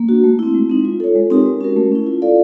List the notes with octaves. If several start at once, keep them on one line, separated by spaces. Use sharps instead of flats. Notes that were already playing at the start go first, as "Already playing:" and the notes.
Already playing: A#3
D4 F#4
A3
C4 E4
G#3
C4 D#4
F4
A4 C#5
G#3
C4 D#4 G4 A#4
G#3
C#4 F#4 A#4
A3
C#4 E4
F4
A4 D5 F5